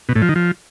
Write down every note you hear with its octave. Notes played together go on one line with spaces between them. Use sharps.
B2
A2
F3
D#3
F3